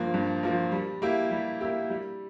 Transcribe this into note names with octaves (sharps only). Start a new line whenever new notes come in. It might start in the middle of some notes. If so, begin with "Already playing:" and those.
Already playing: G2 F3 A#3
G2
F3 A#3
G3
A#3 E4 G4
G3
A#3 E4 G4
G3